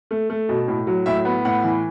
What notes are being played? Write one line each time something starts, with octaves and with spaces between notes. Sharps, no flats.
A3
A3
B2
A2
F#3
A2 E5
B3
A2 F#5
E3